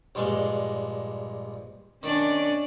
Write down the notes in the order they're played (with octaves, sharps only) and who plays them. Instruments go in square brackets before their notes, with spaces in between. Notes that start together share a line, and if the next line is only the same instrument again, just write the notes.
[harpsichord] A#1 G2 G#3
[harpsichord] D#3 [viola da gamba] C#4 D4 D5